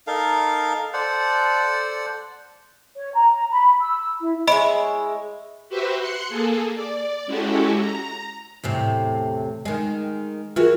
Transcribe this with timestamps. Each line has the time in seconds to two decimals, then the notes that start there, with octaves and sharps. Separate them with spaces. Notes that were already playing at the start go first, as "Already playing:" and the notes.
0.07 D#4 A4 A#4 F5
0.93 A4 C5 D5 F#5
2.97 C#5
3.15 A#5
3.51 B5
3.81 E6
4.21 E4
4.48 G#3 E4 C#5 D#5 B5 D7
5.69 F#4 G4 B4 C5 E5
5.99 C6 F#6 C#7
6.29 A#3 G#4 A4
6.75 D5
7.26 G#3 C#4 E4 F#4 G4 A4
7.78 A#5
8.63 E2 A2 C3
9.65 D#3 G#3
10.56 E3 F4 F#4 G#4 A#4